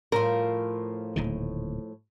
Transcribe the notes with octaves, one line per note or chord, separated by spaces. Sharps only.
A2 F3 F4 A#4
D1 A#2 D#3